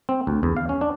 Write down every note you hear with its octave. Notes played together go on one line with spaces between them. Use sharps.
C4
D2
E2
F5
C#4
D4